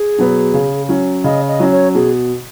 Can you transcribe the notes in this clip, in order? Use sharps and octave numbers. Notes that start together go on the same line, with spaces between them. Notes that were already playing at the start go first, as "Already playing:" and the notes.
Already playing: G#4
B2 F#3 B3
C#3
F#3 C#4
C#3 D#5
D#5
F#3 C#4
C#5
B2 G#4